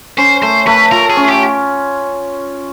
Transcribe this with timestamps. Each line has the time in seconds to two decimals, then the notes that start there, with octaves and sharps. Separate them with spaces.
0.18 C#4 C5
0.42 A3 C5
0.67 A3 B4
0.92 F4 A#4
1.10 G#4
1.17 C#4
1.29 G4